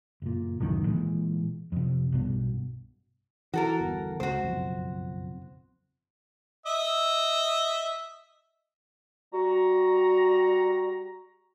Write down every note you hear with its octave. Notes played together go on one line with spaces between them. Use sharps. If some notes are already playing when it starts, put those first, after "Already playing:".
F#1 A#2
D1 C#2 F#2 D#3
A#2 E3 G#3
F2 C3
B1 G2 B2
E3 F#4 A4 A#4
G1 E2
C#2 F#4 C5
F#1 B1 F2
D#5 E5
G3 F#4 A#5